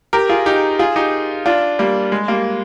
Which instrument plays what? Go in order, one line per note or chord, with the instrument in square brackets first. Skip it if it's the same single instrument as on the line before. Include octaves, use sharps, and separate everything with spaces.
[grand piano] G4 A#4
F4 G#4
D#4 G4
F4 G#4
D#4 G4
D4 F4
G3 A#3
G#3
G3 A#3